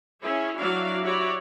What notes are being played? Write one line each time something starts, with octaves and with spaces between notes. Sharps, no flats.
C#4 E4 G#4
F#3 D4 E4 F#4 D5 F5
E4 F#4 G4 C#5 D5